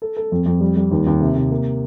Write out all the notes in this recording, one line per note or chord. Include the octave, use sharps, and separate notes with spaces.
A4
A4
F2
F2
G3
G3
D#2
D#2
C3
C3
A#3